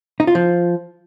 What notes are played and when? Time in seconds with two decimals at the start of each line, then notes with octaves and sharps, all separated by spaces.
0.20 D#4
0.27 F4
0.35 F3